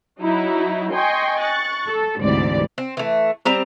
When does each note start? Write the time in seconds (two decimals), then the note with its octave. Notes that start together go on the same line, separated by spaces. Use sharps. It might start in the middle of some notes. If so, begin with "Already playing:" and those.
0.21 F#3 D#4 E4
0.93 D#5 G5 G#5 C6 C#6 G6
1.39 C#6 F#6 A6
1.88 A4
2.19 D2 G#2 C3 E3 D5
2.78 C4
2.97 E3 A3
3.45 G3 C4 A#5